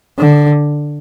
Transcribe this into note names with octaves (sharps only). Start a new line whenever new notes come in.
D3